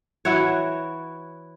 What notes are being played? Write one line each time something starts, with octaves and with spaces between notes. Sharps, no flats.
E3 E4 F#4 C#5